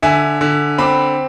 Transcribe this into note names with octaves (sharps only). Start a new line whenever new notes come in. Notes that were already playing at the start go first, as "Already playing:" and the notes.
D3 E5 G#5
D3
C4 B5 D6